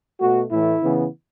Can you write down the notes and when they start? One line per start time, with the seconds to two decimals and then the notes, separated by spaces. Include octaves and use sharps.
0.20 B2 A3 F#4
0.51 A2 E3 A3 E4
0.82 C#3 E3 B3